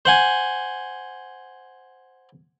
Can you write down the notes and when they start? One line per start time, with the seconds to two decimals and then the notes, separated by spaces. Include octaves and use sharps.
0.05 C5 F#5 G#5